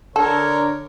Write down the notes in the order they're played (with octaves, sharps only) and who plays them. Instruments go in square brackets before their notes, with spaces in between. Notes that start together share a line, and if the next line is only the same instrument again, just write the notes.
[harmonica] D3 A#4 C#5 [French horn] D4 [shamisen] A4